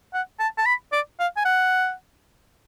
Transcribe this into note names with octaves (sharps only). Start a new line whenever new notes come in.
F#5
A5
A5
B5
D5
F5
G#5
F#5